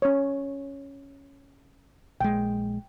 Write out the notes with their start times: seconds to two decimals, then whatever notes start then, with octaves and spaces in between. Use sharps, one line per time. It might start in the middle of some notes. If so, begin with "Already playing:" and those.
0.02 C#4 C#5
2.21 A#1 G#3 G5